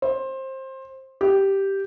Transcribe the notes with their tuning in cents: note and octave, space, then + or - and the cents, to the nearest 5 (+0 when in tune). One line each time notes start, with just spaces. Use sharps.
C5 +20
G4 -5